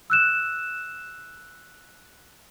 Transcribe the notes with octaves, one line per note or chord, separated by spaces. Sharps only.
E6 F#6 E7